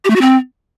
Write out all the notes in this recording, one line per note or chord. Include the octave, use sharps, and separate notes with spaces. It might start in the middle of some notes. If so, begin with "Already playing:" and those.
G4
A3
F#4
C4